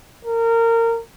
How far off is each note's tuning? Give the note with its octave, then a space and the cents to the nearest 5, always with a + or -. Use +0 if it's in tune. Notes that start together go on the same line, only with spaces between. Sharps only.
A#4 -25